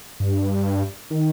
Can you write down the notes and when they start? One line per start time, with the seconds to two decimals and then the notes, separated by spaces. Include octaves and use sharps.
0.20 G2
1.11 D#3